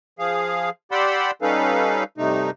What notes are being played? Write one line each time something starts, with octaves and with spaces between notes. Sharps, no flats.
F3 G#4 F5
G4 D5 F#5 B5 C6 E6
G3 C#4 D#4 A4 B4 F5
G2 C3 A3 D#4